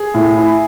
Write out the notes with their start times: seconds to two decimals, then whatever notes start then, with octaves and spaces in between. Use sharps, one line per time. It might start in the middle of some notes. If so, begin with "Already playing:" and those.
Already playing: G#4
0.14 A2
0.37 E4